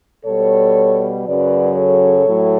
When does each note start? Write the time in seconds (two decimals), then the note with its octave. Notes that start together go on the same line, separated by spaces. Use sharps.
0.24 B2 G3 A4 C#5
1.25 F#2 C#3 F#3 B4 D5
1.76 A4 C#5
2.25 A2 F#3 A3